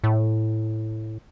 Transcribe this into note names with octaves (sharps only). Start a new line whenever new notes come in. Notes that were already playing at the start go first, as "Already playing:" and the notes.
A2